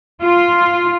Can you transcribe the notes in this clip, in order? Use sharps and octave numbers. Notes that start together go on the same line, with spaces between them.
F4